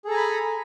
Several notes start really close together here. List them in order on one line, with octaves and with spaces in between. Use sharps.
G#4 A4 A#5 G#5 B5